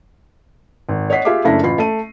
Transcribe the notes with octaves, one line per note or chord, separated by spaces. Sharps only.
G#1
C#5 D#5 F#5 B6 C7
F4 G4 G#4 E5 F5 D6
F#1 C#3 A3 D4 E4 A#6
A1 F4 B5 C7
A3 D#7